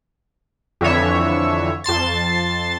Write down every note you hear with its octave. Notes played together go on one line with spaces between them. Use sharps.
F2 D3 E3 C#5 E5
F2 A5 C6 A6